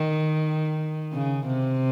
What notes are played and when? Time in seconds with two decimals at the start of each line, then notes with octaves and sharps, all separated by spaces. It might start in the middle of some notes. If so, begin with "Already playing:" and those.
Already playing: D#3
1.13 C#3
1.47 C3